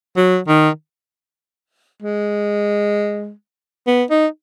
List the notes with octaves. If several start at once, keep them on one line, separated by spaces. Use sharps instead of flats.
F#3
D#3
G#3
B3
D#4